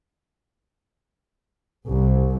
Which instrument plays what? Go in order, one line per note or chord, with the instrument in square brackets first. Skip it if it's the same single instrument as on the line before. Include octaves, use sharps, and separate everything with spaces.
[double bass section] C2